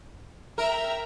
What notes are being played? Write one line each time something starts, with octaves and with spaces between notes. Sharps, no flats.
A#4 E5 G5 A#5